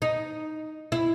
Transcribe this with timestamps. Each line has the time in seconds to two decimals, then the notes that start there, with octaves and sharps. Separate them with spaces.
0.02 D#4
0.92 E4